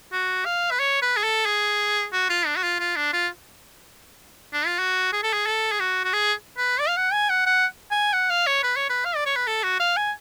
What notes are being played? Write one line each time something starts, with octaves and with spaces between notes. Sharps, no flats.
F#4
F5
B4
C#5
B4
G#4
A4
G#4
F#4
F4
D4
F#4
F4
F4
D4
F4
D4
F4
F#4
G#4
A4
G#4
A4
G#4
F#4
F#4
G#4
B4
D5
F5
F#5
G#5
F#5
F#5
G#5
F#5
F5
C#5
B4
C#5
B4
F5
D5
C#5
B4
A4
F#4
F5
G#5